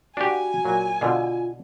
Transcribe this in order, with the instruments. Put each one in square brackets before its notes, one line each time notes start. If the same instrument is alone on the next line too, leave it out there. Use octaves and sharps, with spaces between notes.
[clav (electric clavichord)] D4 G4 [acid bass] F#4 [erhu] G#5
[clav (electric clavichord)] A#2 F#3
[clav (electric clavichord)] B2 D3 [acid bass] F4